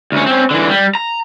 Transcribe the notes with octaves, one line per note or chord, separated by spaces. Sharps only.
D2 C#4
C4 C#4
D3 E3
G3
A#5